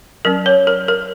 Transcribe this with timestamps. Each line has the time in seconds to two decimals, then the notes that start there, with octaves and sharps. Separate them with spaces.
0.25 F#3 C#4 A#4
0.46 C#5
0.67 A#4
0.88 A#4